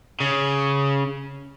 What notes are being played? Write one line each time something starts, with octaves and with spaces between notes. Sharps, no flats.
C#3